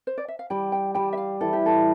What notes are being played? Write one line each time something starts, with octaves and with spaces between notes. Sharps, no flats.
C5
D5
E5
F5
G3 G5
G5
G3 G5
E5
F5
E3 A4
G4
A4